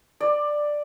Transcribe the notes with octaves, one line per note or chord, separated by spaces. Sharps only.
D5